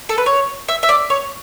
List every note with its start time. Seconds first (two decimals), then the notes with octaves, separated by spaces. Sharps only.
0.09 A4
0.18 B4
0.26 C#5
0.68 E5
0.83 E5
0.89 D5
1.10 C#5